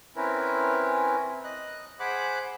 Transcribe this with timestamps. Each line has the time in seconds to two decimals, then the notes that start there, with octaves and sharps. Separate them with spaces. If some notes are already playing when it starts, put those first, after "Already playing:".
0.16 C4 C#4 E4 A#4 B4
1.44 D#5 F#6
2.00 G#4 C5 F#5 B5 D6 F#6